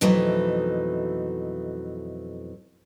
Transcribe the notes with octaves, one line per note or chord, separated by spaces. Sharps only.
F2 B2 E3 F#3 A3 D#4